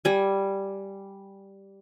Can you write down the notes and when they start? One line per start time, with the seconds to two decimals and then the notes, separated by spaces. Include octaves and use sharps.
0.05 G3 G#5